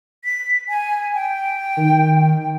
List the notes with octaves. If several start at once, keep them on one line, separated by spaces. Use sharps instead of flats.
B6
G#5
G5
D#3